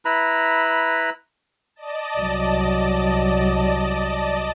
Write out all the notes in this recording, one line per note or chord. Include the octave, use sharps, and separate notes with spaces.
E4 B4 A#5 B5
D5 D#5 A5
C2 F#3